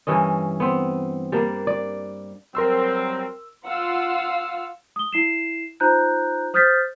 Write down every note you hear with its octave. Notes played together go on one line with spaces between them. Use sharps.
G2 E3 C#4 D#5
B3 C4
G3 A#3 D4
D5
F#3 G3 C4 A#4 C6 E6
F4 F5 F#5 E6
D#6 G7
E4 C7 E7
D#4 F4 C5 A#5 F#6 G6
C5 D#6 F6 G6 A6 B6